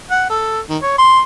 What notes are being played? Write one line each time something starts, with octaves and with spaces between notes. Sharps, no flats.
F#5
A4
D#3
C#5
C6